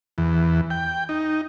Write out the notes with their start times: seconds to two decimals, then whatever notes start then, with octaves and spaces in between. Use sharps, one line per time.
0.18 E2
0.70 G5
1.09 D#4